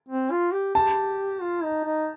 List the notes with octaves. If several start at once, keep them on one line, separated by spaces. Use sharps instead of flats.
C4
F4
G4
G4 A5
F4
D#4
D#4